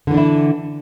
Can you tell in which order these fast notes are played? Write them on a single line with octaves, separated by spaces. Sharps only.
D3 E3 D4 E4